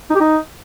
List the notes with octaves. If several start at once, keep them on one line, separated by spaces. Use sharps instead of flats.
D#4
G4
D#4